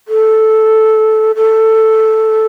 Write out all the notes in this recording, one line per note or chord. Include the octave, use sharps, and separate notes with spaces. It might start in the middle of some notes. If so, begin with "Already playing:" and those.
A4
A4